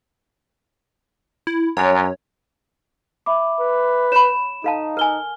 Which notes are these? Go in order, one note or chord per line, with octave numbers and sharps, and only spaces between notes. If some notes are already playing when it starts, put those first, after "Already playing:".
E4
F#2 C#5
E5 B5 D6
B4
C#5 B5 E7
D#4 A4 F5 A5
A#4 G#5 F6 G7